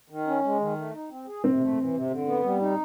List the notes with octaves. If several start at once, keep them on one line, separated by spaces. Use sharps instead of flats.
D#3
C#4
G#3
D#3
A3
D#4
C4
G#4
C3 C4
A3
E3
C3
D3
B3
G3
D#4